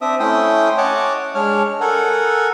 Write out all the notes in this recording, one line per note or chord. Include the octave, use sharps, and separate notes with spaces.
C4 D4 E5 D#6
A3 C#4 E4 G5 C6 D#6
C#5 D#5 F#5 G#5 A5 D6
G#3 D4 C#5 F6
A4 A#4 F#5 G#5